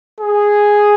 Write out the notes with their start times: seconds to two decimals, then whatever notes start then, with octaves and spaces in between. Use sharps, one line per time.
0.21 G#4